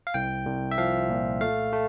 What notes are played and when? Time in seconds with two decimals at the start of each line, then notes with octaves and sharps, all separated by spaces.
0.07 F5
0.14 C2 G5
0.46 C2
0.71 E5
0.78 F3 F5
1.09 A#2
1.41 A3 F5
1.73 A3